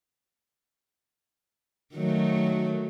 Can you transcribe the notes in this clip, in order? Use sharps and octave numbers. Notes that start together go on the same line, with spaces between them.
D#3 F#3 A3